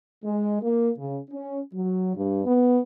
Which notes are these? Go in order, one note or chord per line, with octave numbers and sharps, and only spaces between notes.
G#3
A#3
C#3
C#4
F#3
G2
B3